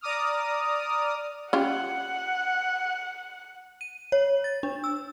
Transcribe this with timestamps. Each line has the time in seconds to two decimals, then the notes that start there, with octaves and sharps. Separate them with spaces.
0.01 D5 A#5 D6 D#6 F6
1.53 C#4 F4 G4 F#5
3.81 D#7
4.12 C#5
4.44 A6
4.63 D4
4.84 E6